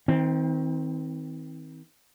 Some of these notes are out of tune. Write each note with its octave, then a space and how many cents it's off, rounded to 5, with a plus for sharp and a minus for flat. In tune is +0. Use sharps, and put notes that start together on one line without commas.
D#3 +35 C4 -10